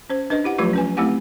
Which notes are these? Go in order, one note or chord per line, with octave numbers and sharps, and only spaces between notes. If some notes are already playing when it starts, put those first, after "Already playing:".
C#4 C5
D4 B4 D#5
E4 G4 F#5
F3 F#3 A3 F4 G4 B4
C#4 B4 G#5
A3 C4 E4 G4 F#5 G#5